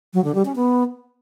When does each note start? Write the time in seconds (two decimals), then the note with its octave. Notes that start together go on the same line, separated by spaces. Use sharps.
0.14 F#3
0.24 D3
0.35 G3
0.45 C#4
0.56 B3